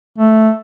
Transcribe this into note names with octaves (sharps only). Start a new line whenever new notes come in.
A3